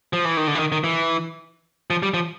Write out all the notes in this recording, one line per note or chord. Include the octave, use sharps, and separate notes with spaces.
F3
E3
D#3
D3
E3
D#3
D#3
E3
F3
G3
F3